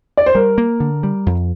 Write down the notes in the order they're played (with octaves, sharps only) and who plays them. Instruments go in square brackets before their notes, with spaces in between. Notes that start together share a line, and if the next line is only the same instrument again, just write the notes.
[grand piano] D5
C5
[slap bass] G3 [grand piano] A#4
[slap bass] A#3
D3
G3
F2